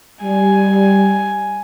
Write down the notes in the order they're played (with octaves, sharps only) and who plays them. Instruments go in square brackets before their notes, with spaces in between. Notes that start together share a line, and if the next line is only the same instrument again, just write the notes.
[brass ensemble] G3 [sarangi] G#5